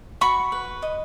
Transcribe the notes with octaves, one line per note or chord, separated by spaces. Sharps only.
F#4 B5 C#6
B4
D#5